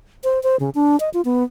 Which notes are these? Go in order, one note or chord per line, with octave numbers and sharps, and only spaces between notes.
C5
C5
C#3
D4
D#5
F4
B3